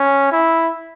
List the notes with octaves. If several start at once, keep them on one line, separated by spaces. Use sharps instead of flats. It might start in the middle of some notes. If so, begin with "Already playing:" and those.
Already playing: C#4
E4